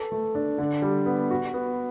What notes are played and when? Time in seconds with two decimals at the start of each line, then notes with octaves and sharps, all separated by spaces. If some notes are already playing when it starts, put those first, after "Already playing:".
Already playing: A4 B4
0.12 A3
0.35 D4
0.58 D3
0.82 G3
1.06 B3
1.31 F#4
1.54 B3